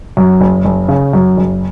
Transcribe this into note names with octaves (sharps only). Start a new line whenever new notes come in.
F#2
F#1
F#1
C#3
F#2
F#1